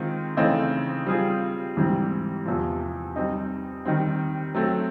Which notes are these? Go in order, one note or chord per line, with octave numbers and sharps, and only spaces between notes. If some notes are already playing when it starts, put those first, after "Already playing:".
Already playing: D#3 G#3 C4 F4
C#3 E3 A3 C4 D#4
G3 C4 F4 G#4
G#2 E3 G3 C4
E2 C3 F3
G3 C4 D#4
D#3 G3 C4
F#3 A3 C4